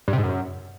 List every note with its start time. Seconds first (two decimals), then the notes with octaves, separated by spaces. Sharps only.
0.08 G2
0.13 C3
0.18 G#2
0.23 F#2